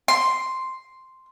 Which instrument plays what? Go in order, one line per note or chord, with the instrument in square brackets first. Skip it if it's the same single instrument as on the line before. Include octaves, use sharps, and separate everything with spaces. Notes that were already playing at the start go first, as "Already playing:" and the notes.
[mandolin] C6